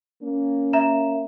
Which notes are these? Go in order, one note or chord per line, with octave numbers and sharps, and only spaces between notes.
A#3 C#4
E5 A#5 E7